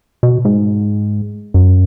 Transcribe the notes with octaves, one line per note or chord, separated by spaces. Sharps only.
B2
G#2
F#2